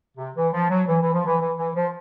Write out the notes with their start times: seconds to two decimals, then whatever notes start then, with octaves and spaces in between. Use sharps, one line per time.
0.18 C3
0.36 E3
0.53 F3
0.70 F#3
0.88 E3
1.01 E3
1.13 F3
1.26 E3
1.39 E3
1.57 E3
1.75 F3